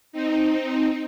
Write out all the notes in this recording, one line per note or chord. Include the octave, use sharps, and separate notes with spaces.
C4 D#4